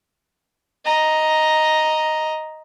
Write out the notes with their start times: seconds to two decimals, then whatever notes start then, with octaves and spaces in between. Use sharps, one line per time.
0.85 D#5 A#5